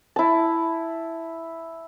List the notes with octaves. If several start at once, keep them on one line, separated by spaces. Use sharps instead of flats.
E4 A5